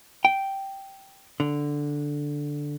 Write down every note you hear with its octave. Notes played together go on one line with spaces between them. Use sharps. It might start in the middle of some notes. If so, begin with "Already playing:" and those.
G5
D3